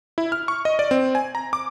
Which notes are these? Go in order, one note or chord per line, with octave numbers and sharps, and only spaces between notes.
E4
F6
C#6
D#5
D5
C4
G#5
A#5
D6